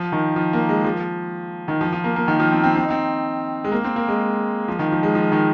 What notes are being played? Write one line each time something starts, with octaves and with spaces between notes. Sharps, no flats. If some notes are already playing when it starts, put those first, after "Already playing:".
Already playing: F3
D#3
F3
A#3
G#3
F3
D#3
F3
F3
A#3
A#3
D#3
F3
C4
C4
C4
D#4
C4
G#3
A#3
C4
A#3
G#3
F3
D#3
F3
G#3
F3
D#3